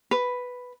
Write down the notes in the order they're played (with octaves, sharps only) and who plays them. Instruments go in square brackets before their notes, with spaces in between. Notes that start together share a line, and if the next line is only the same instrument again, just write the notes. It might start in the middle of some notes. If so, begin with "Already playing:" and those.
[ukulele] B4